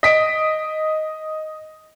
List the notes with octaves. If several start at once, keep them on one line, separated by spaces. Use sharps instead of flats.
D#5 B6 D7